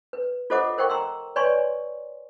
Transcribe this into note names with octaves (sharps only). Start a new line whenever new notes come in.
B4
F4 A4 C5 D#5 F#5 D6
A#4 C5 F#5 G5 C#6
A#5 C6 E6
B4 C#5 D5 G#5 C6 C#6